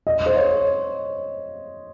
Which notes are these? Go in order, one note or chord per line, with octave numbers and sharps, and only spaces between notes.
D#5
C5
C#5